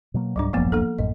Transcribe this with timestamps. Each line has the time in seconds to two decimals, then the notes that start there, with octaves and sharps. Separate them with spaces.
0.14 B2 F#3 A#3
0.36 C#2 G#2 F#3 G3 D4
0.53 D1 G#1 F#2 F3 A#3 B3
0.72 A#3 D4 A4
0.99 A1 F#2 A2 D#5